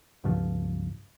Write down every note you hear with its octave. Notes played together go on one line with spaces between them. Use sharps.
C#2 G2 F3